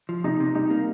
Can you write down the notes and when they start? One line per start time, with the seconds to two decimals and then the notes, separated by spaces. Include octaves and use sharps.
0.09 F3
0.24 C3 D#4
0.40 C3
0.55 G3 D#4
0.70 A#3